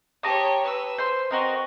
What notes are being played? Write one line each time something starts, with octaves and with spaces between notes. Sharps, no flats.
G4 C#5 A5 A#5 D#6
B4 E6
C5 C6
C4 F#4 A#4 D#5